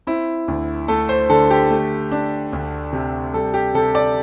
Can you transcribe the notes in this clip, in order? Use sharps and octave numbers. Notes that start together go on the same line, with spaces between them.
C4 E4
D2
A3 A4
C5
D3 A4
G4
A3
D4
D2
C3
G3 A4
G4
C3 A4
D5